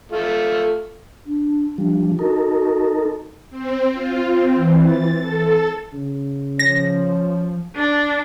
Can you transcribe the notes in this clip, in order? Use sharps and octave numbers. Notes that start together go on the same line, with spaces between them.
A3 F4
D4
F3 G3 D4
D#4 F#4 A4 A#4
C4
F4
C4
E3
A6
A4
C#3
F3 C#4 A#6
D4